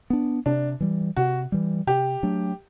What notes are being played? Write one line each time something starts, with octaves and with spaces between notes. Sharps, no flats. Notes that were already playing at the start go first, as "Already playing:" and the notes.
B3 D4
C3 D4
E3 G3
C3 F#4
E3 G3
C3 G4
F#3 A3 D4